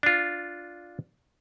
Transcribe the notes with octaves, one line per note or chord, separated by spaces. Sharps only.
D4 F4